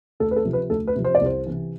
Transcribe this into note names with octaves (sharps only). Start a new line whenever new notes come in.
D2 A4
B4
A4
C3 F3
B4
D2 A4
B4
C3 F3
C5
D5
C2 C5
C3 E3